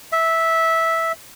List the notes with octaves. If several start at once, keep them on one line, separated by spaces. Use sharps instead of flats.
E5